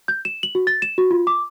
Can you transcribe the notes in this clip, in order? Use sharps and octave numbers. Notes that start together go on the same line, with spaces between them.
G6
E7
F#7
F#4
A6
E7
F#4
F4
D6